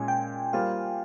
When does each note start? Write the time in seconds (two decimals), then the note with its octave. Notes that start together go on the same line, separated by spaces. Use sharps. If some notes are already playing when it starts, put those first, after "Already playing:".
Already playing: A#2 G#3 C#4 G#5
0.08 G5
0.53 G3 A#3 F4 C5 F5